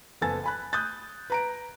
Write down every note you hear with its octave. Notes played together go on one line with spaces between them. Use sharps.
F#1 B3 A4 G#5 A6
G#5 B5 F#6
D#6 F#6 G6 A6
B4 A#5 D7